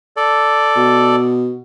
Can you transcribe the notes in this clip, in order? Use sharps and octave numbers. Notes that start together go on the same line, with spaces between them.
A4 D5
B2